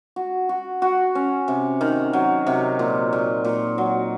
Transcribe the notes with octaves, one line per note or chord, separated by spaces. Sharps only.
F#4
F#4
F#4
C#4
C3
D#3
F#3
C3
A#2
A#2
A#2
F#3